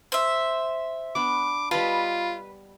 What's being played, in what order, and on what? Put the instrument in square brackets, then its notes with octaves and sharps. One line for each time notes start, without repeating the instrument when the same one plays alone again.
[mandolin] C5 E5
[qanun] B3 D4 [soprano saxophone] D6
[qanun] G3 D#5 A5 [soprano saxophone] F4 [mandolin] B4